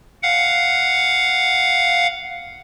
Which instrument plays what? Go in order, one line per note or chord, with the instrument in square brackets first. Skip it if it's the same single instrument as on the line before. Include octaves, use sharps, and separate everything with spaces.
[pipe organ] F5 F#5